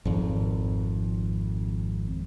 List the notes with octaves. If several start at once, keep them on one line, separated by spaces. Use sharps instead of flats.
G#1 F2